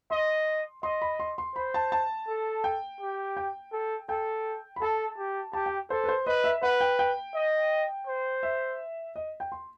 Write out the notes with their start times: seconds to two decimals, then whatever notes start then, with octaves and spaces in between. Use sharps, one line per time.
0.11 D#5 C6
0.83 D#5 C6
1.02 B5
1.20 C6
1.38 C6
1.55 C5 B5
1.74 A5
1.92 A5
2.28 A4
2.64 G5
3.01 G4
3.37 G5
3.73 A4
4.09 A4 G5
4.76 B5
4.81 A4 A5
5.18 G4
5.53 G4 A5
5.66 G5
5.90 A4 C5
6.04 B4
6.08 C5
6.26 B4 D#5
6.44 E5
6.63 B4 F#5
6.81 G5
6.99 G5
7.35 D#5
8.07 C5
8.43 E5
9.16 D#5
9.40 G5
9.52 C6